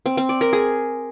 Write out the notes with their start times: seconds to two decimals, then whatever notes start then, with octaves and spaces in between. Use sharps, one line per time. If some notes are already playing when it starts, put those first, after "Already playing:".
0.06 C4
0.17 C4
0.29 D5
0.41 A#4
0.53 G#4